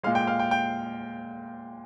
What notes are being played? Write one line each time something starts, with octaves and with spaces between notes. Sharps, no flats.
A#2 G#3 F5
G5
F5
G5
G5